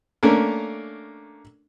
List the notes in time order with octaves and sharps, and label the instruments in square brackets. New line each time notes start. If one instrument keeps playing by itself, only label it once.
[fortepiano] A3 A#3 C#4 D4 A#4